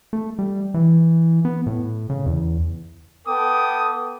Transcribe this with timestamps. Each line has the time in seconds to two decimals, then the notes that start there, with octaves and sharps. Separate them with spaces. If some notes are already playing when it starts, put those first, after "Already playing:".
0.13 A3
0.39 G3
0.74 E3
1.45 B3
1.67 A2
2.10 C#3
2.26 E2
3.27 B3 A4 G5 D6 D#6